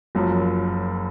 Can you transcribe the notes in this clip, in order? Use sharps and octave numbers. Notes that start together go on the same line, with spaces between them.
F#1 F#2 F3